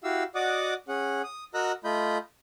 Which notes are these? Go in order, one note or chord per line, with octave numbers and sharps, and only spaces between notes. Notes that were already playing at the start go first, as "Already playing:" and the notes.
E4 F#4 G4 F5 E6
F#4 D5 D#5 F#5 D6 D#6
C#4 G#4 F#5
D#6
F#4 A#4 D#5 A#5 E6 F#6
A3 F4 D#5 B5 G6